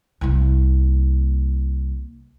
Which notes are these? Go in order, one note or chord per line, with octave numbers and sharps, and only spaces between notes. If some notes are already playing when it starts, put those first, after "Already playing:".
C2 A#3